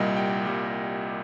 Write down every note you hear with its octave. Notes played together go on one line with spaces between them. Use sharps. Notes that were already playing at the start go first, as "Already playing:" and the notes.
Already playing: C2 A#2 G3 D#5
G5
A#2 G3